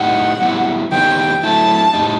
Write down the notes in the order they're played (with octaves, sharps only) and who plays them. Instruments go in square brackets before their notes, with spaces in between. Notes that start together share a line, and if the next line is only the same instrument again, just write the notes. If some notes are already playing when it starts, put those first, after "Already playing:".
Already playing: [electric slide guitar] A2 G3 D#4 G4 [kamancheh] F#5
[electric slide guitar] G3 B3 E4
[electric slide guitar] D#3 G3 B3 D#4 G4 [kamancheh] G5
[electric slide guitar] F#3 A3 E4 [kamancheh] A5
[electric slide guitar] A2 G3 D#4